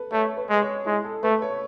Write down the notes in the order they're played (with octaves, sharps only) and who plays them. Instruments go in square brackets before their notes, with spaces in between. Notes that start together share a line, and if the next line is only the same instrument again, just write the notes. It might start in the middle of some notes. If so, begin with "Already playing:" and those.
Already playing: [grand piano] A4 B4
[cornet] A3 [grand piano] C#5
[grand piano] B4
[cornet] G#3
[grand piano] C#5
[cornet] G#3 [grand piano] E4
[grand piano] A4
[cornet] A3 [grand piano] B4
[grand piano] C#5